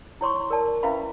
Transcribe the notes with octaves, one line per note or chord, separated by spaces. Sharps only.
E4 C#5 C6 C#6
A#4 D5 A5
C#4 E4 B4 E5 F5 B5